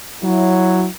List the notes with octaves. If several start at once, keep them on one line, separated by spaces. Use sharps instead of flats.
F#3 E4